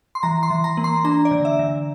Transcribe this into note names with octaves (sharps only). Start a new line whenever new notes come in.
C6
E3 A#5
C6
E3
A#5
A#3
C6
D4 A#5
D5
D3
E5
D3